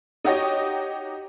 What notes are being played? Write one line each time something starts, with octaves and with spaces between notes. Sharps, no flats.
D#4 F#4 G4 C#5 D#5